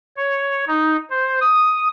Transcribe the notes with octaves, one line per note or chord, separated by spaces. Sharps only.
C#5
D#4
C5
D#6